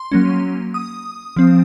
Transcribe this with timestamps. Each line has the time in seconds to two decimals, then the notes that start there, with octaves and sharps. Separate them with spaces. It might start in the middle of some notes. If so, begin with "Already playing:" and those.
Already playing: C6
0.12 F#3 A#3 C#4
0.74 D#6
1.36 F3 C4